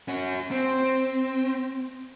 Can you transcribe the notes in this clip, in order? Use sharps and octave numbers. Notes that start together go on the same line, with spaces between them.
C#4 F#4
C4